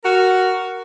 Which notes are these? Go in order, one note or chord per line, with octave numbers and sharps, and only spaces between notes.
F#4 A#4